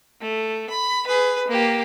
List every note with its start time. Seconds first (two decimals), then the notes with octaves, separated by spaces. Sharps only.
0.22 A3
0.70 B5
1.07 G#4 B4
1.48 A#3 G4